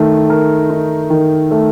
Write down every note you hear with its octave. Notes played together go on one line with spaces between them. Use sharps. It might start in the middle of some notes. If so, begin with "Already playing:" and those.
Already playing: D#3 A3 D#4
A#4
D#4
D#3
A3